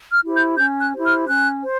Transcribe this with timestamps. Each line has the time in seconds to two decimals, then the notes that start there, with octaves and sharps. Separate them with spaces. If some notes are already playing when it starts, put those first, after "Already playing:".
0.11 F6
0.23 E4 G4 C5
0.35 G6
0.58 C#4 G6
0.82 F#6
0.93 E4 G4 C5
1.05 F6
1.28 C#4 F#6
1.63 C5